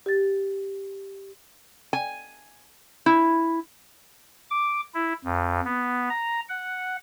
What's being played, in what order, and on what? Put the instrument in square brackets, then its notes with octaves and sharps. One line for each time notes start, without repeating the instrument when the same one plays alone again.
[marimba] G4 A6
[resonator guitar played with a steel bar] G#5
E4
[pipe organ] D6
E4
F2
B3
A#5
F#5